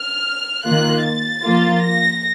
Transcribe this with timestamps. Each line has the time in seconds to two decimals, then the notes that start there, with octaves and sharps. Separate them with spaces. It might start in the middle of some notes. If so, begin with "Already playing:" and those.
Already playing: F6
0.65 D#3 A#3 F4 F#6
1.05 A6
1.44 F3 A#3 F4
1.84 A#6